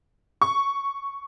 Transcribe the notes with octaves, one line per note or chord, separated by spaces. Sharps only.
C#6